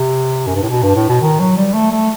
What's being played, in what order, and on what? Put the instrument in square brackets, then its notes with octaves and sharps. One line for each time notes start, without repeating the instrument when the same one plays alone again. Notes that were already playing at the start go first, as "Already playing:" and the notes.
Already playing: [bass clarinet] C3
F#2
G2
A2
B2
G2
A2
B2
D#3
F#3
G3
A3
A3